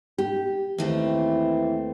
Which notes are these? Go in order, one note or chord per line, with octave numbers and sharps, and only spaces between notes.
G4
D#2 E3 A3 C4